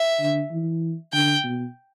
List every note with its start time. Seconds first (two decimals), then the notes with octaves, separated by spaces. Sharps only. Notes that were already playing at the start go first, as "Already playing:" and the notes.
Already playing: E5
0.20 D3
0.51 E3
1.13 D3 G5
1.44 B2